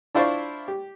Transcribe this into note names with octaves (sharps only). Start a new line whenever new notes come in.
D4 E4 F4 C5 D5 C#6
G4